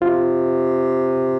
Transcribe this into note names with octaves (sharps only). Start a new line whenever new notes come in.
C3 F4